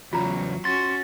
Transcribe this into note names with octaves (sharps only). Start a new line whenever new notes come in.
E2 C#3 F#3 F4 A#5
C#4 F#4 C6 A6